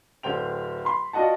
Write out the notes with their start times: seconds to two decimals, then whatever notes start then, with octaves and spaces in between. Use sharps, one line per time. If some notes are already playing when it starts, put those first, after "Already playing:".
0.23 D1 D3 C5 G5 F7
0.85 B5 C6
1.13 D4 F4 F#4 D#5 F#5 A5